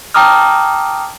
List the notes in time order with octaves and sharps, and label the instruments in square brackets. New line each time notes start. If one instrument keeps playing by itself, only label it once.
[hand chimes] G5 A5 A#5 D6 D#6 F6